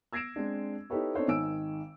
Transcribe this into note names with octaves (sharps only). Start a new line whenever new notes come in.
E6 G#6 A#6 C7 D7 E7
G#3 C4 D4
D#4 E4 G4 A4 B4 C#5
C4 D4 D#4 A4 C5 C#5
G#1 D#3 D#4 G#5 E6 D7